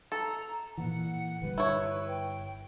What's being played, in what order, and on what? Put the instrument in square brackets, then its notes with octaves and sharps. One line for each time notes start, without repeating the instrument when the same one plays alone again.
[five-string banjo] A4 [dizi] A#5
[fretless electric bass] A#2 E3 [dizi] F#5
[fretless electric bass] G1 G3 [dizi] B4
[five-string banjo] E4 C#5
[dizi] G5